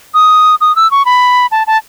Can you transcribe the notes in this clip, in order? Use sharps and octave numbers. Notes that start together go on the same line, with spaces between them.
D#6
D#6
E6
C#6
B5
A5
A5